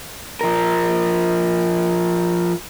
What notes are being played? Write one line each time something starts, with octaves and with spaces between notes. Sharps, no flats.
F3 A#4